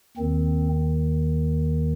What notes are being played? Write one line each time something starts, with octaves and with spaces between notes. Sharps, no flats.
D#2 D#3 C4